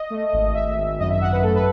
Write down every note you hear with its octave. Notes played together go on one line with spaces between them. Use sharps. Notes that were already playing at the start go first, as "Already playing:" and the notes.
Already playing: D#5
A3
G#1
G#1 E5
G#1
F#2 D#5
E5
F#2 F#5
B4
A3 A4
B4